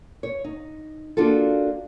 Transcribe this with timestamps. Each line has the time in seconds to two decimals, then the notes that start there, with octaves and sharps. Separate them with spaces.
0.23 C#5
0.44 D#4
1.17 A#3 D4 F4 F#4 A4